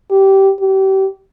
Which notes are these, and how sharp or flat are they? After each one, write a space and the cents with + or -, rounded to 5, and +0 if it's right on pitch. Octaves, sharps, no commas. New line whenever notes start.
G4 -15
G4 -30